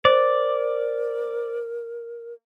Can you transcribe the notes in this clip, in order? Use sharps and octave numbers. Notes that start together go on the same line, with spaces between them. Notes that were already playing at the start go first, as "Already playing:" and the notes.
A#4 C5 D5